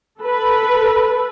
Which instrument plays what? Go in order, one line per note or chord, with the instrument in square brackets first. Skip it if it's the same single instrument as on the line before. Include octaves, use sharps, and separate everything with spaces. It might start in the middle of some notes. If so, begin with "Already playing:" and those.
[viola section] A4 B4